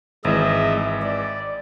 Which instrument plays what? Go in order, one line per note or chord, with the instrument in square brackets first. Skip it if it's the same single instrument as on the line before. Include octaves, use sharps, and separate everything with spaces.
[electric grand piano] G#1 E3 [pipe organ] G#3 D#5 E5
[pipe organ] D5